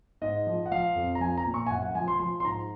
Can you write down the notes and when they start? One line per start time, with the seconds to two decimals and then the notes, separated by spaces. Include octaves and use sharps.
0.21 G#2 D#5
0.47 F3
0.66 F#5
0.71 F3 F5
0.95 F2
1.15 A#5
1.20 F3 G#5
1.38 A#5
1.46 A#2
1.54 C#6
1.67 G#5
1.70 F#2 F#5
1.83 F#5
1.95 F3 G#5
2.08 C6
2.19 F3 C6
2.40 C6
2.44 G#2 A#5